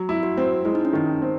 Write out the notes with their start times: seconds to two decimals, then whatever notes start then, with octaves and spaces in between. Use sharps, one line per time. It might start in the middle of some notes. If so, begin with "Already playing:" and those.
Already playing: F#3
0.09 E4
0.23 F#4
0.37 C4
0.65 G#3 E4
0.75 D#4
0.85 C#4
0.93 D#3 D#4
1.22 C4